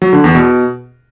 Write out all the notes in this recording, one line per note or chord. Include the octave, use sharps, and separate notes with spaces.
F#3
D3
E2
B2